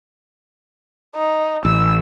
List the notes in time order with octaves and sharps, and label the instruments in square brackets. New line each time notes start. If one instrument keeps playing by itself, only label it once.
[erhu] D#4
[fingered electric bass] A1 [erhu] E6